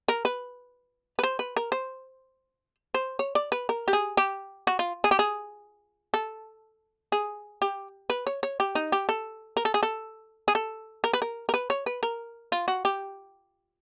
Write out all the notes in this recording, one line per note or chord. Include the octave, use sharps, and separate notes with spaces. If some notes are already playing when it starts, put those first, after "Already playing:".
A#4
B4
B4
C5
B4
A#4
C5
C5
C#5
D5
B4
A#4
G4
G#4
G4
F#4
F4
G#4
G4
G#4
A4
G#4
G4
B4
C#5
C#5
G4
D#4
G4
A4
A#4
A4
G#4
A4
G#4
A4
A#4
B4
A#4
A#4
B4
C#5
B4
A#4
F4
F#4
G4